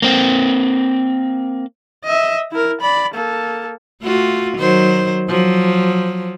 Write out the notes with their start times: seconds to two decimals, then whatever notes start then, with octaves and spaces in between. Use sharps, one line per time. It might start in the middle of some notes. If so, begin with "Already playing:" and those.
0.02 A#3 C4
2.04 D#5 E5
2.51 E4 A#4
2.81 D5 B5
3.14 A#3 A4
4.02 A3 F4 F#4
4.58 D#3 F#3 C5
5.29 F3 F#3